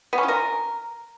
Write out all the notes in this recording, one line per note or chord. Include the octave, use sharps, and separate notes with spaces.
B3
C#4
F4
A#4